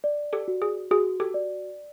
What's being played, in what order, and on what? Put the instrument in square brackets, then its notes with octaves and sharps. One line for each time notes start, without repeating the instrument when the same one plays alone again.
[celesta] D5
[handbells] G4 A4
[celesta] F#4
[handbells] G#4
[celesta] F#4 [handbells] G#4
[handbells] G4 A4
[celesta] D5